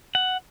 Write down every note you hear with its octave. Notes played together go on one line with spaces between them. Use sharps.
F#5